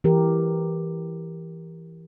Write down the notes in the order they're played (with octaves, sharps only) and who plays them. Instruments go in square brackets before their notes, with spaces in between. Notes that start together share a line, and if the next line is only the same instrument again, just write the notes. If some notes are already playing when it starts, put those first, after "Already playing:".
[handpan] E3 G4 A#4